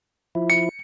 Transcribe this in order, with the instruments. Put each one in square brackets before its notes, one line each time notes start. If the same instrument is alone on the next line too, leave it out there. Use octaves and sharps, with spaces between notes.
[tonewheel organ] F3 E4
[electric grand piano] C#7